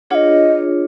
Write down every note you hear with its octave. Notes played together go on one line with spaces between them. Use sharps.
D4 F4 G#4 C#5 D#5 F#5